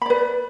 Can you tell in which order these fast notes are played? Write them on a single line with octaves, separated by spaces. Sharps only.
B5 D5 B4